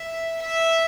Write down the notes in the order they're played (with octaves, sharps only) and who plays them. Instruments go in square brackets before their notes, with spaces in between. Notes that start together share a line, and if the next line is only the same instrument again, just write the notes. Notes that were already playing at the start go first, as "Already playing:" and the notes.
Already playing: [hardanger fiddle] E5
E5